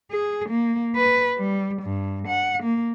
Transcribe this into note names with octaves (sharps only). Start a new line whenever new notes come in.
G#4
A#3
B4
G3
G2
F#5
A#3